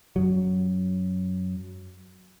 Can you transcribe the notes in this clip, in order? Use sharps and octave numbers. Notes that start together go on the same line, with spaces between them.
F#2 F#3